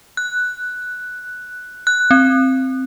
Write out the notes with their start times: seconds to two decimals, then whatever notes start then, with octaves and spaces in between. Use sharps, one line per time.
0.17 F#6
1.87 F#6
2.11 C4